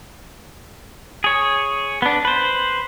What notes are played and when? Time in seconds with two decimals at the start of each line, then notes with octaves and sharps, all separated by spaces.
1.24 G#4 C#5
2.02 B3 D4
2.25 B4 C5